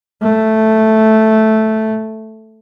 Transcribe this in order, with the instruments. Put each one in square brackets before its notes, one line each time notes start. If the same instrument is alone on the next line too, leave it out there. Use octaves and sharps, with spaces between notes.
[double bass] A3